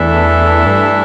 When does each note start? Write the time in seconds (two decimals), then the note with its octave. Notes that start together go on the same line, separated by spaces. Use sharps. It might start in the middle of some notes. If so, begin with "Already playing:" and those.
Already playing: E2 E3 A3 D4 A4 E5
0.66 G2